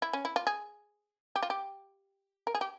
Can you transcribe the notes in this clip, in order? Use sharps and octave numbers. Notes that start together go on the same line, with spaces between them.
E4
C#4
E4
F4
G#4
G4
F4
G4
A#4
G#4
G4